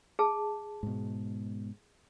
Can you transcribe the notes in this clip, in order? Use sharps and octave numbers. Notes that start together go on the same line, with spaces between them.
G#4 A5
G#2 B2